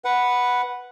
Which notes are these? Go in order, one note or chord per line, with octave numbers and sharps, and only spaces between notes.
B4 F#5